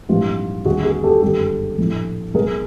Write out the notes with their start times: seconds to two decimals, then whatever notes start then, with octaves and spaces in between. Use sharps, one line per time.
0.09 A#1 G#2 E3 G3 F4 G4
0.65 D#2 D3 G3 F#4 G#4
0.85 F#4 G#4
1.03 G4 A4
1.22 G1 F#2 D#3 G#3 G4 A4
1.78 A#1 A2 F3 A3
2.34 B1 B2 G#3 G#4 A#4